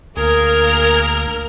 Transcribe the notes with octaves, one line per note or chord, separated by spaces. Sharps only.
D2 A#3 G#4 A#4 F6